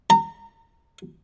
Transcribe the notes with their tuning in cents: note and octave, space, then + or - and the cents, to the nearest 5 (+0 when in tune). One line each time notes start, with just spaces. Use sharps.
A#5 -30